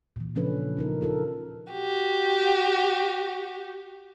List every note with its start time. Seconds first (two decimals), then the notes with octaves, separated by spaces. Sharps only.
0.16 A#2 E3
0.35 C#3 F3 C#4 D4 A4 B4
0.77 C#4 D#4 A#4
1.01 F4 A4 A#4
1.72 F#4 G4